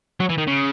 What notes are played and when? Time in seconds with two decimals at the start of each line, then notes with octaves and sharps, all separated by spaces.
0.20 F#3
0.29 E3
0.38 D#3
0.47 C#3